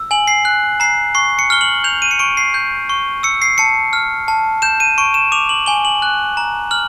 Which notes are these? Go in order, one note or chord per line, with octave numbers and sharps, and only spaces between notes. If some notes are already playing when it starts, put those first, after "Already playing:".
Already playing: E6
G#5 F#7
C7
F#6
A#5 C7
C#6 C7
C#7
F6 G7
F#7
G6 F7
D#7
C#7
C#6 D7
C7
G6
C#6
E6 C#7
C7
A5 C#7
F6
A5
G6 E7
D#7
C#6 D7
E7
D6 F7
F#7
G#5 G7
F#7
F#6
A#5
F6 F#7